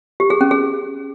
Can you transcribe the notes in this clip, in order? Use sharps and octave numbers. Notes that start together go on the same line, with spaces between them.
G4
G#4
C#4
G#4